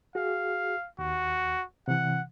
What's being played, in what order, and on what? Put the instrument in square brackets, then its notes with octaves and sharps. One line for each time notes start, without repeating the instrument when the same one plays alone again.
[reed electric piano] F#4 G#4 [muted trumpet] F5
[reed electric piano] D#2 [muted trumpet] F#4
[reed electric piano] C3 E3 [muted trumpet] F#5